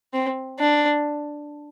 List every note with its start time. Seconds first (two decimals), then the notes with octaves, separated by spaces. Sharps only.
0.13 C4
0.59 D4